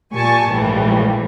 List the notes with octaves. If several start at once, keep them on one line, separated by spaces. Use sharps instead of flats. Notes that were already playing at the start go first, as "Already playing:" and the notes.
A#2 G4 G#5 A5 C#6
A#1 D#2 G#2 E3 G3 A3